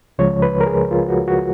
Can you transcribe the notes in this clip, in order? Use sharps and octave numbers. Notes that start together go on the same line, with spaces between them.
C#2 C#3 F3 G#3 C#5
B4
A#4
G#4
F4
F#4
F#4